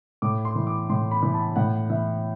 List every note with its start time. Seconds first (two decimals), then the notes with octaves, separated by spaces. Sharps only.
0.22 A2 D6
0.45 C6
0.55 E3
0.67 D6
0.89 A2 C6
1.11 B5
1.23 E3
1.34 A5
1.56 A2 F#5
1.90 E3 E5